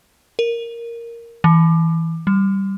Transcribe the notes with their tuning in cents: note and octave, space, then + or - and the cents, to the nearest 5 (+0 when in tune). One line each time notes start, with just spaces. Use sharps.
A#4 +0
E3 -10
G3 -10